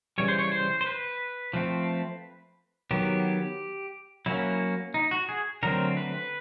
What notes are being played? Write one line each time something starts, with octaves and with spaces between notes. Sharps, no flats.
C#3 E3 G3 C#5
C5
C#5
C5
C5
B4
F3 A3 C4
D#3 F#3 B3 G4
F#3 A#3 C#4 E4
D#4
F#4
G#4
D3 F#3 A3 C4 A#4
B4